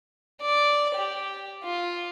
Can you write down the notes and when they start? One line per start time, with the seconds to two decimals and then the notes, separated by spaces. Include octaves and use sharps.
0.42 D5
0.95 G4
1.65 F4